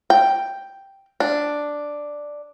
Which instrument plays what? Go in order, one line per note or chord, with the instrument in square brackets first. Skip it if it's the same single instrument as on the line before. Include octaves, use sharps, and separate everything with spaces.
[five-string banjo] G5
D4